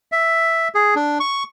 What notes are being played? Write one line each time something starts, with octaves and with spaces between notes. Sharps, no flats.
E5
G#4
D4
C#6